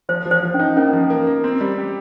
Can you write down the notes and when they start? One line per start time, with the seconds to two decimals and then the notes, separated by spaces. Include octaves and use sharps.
0.09 F3 C5
0.26 F3
0.31 C5
0.43 F3
0.54 C#4
0.59 D#4
0.77 A#3 C#4
0.93 F3
1.10 A#3
1.27 A#3
1.44 C4
1.60 G3
1.78 G4